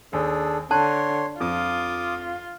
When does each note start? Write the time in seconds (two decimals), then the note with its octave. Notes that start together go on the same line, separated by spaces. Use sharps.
0.13 D#2 D4 G#4 A4
0.71 D3 C#5 A5 C6 F#6
1.41 F2 F4 D6 D#6